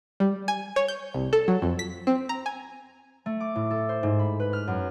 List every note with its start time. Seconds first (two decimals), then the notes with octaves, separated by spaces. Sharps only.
0.20 G3
0.48 G#5
0.76 C#5
0.88 G6
1.14 C2
1.33 A4
1.48 F#3
1.62 F2
1.79 B6
2.07 C4
2.29 A#5
2.46 G#5
3.26 A3
3.40 D6
3.55 A2
3.70 A4
3.89 C5
4.03 G#2
4.19 B5
4.40 B4
4.53 F6
4.67 F#2